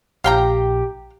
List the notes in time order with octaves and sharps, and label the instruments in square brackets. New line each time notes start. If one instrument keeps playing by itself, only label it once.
[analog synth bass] A#1 [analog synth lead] G4 [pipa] F5 G5 A#5